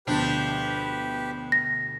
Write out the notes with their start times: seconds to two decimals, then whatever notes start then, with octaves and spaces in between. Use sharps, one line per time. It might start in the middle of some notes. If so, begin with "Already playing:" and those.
0.07 D2 B2 F3 D4 G4 B4
1.52 A#6